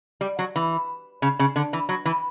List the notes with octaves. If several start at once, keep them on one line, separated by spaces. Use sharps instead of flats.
G3
F#3
E3
C#3
C#3
D3
E3
F#3
E3